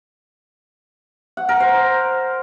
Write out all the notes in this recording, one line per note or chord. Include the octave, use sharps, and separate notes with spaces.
F#5
A#4
C5